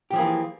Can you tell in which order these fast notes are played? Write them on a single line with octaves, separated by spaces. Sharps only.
G4 F3 G#4 A#3 E3